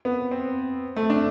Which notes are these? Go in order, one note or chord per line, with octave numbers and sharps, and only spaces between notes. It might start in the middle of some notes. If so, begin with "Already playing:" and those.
B3
C4
A3
D4